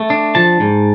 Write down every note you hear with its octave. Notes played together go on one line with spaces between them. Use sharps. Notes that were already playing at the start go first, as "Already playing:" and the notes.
Already playing: A3
D4
F3 A5
G#2